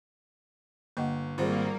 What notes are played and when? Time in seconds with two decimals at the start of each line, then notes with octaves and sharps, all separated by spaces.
0.97 G1 A#3 D#5 F#5
1.38 G#1 G3 A#3 C4 F4 G#4